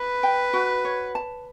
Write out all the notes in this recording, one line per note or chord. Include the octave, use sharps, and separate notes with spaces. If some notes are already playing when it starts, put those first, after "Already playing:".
Already playing: B4 B5
G5
F#4
C#5
A5